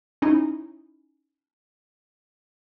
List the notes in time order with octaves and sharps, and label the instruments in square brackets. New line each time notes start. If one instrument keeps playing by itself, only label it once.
[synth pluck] C#4 D#4 E4